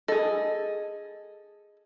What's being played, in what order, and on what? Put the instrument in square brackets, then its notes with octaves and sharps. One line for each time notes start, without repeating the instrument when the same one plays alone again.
[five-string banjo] G#4 A4 [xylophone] D#5